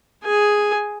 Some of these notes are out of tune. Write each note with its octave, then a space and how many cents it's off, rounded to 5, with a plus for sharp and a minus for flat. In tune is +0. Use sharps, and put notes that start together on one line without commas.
G#4 +0 G#5 +0